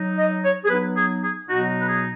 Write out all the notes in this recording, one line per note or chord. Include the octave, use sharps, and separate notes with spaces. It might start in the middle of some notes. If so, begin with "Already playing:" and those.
Already playing: F#3 D#4
D#5
C#5
G#4
F#3 B3 D#4 B4
G#4
G#4
B2 F#3 B3 D#4 F#4
B4
G#4